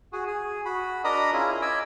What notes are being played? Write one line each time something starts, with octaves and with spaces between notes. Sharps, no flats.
F#4 G#4
G#4
F#4 B5
D4 A#4 D#5 A#5 B5 D#6
C#4 E4 F4 G#4
D#5 G#5 B5 D6 E6